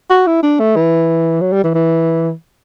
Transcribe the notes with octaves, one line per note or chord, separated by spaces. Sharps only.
F#4
E4
D4
A3
E3
F#3
G3
E3
E3